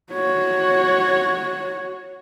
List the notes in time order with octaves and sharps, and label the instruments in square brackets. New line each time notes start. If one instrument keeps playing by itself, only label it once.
[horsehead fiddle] F#4 C#5